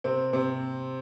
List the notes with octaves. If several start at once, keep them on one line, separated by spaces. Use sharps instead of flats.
C3 C4
C3 C4